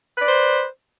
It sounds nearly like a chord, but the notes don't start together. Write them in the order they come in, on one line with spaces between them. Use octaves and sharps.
B4 D5 C5